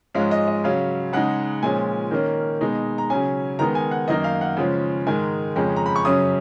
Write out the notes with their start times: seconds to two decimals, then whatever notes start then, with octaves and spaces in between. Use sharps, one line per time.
0.15 G#2 F3 G#3 C#4 F5
0.31 D#5
0.48 D#5
0.64 C#3 F#3 C#4 F5
1.13 C#3 G#3 D#4 F#5
1.63 A#2 F3 G#3 C#4 G#5
2.11 D#3 A#3 C#4
2.61 B2 G#3 D#4
2.98 A#5
3.10 C#3 F#3 C#4 G#5
3.59 D#3 G#3 B3 D#4 A#5
3.75 G#5
3.91 F#5
4.08 F#2 D#3 A#3 D#4 D#5
4.24 F5
4.41 F#5
4.57 C#3 F3 G#3 C#4
5.06 G#2 D#3 G#3 G#5
5.56 F2 C#3 G#3 C#4
5.76 A#5
5.86 B5
5.96 C#6
6.05 F#2 C#3 F#3 C#4 D#6